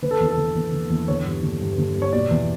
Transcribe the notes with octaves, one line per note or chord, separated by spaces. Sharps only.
D3 B4
A4
E2
A4
D3
E2
D3
E2
D3 C#5
G2
D3
G2
D3
G2
C#5
B2 D5
E2